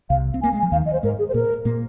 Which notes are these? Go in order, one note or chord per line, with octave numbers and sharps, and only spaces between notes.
C2 C3 F5
C4
A#3 G#5
G#3
G#5
F3
D#2 D#3 F5
D#5
C5
G#2 G#3 A#4
G#4
C5
A#2 A#3 A#4
A#2 A#3